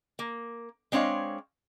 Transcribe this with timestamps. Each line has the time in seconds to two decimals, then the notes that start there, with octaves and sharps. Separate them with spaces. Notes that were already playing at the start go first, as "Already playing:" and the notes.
0.19 A#3
0.92 G#3 C4 D4 C#5 F5